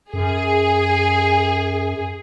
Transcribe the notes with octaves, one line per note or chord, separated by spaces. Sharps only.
F#2 G#4